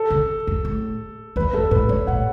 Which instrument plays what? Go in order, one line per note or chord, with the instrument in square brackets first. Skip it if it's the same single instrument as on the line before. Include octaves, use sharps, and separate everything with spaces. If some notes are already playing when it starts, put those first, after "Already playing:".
Already playing: [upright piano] A4
[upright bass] C#3
F#2
A2
[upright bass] E2 [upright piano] B4
[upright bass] F#2 [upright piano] A4
[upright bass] A2 [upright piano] B4
[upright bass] F#2 [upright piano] C#5
[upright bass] A2 [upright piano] F#5